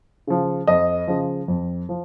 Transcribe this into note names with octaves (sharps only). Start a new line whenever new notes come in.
C#3 F3
F2 D#5
C#3 F3
F2
F3